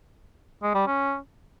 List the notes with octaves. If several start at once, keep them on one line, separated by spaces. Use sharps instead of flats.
G#3
G3
C#4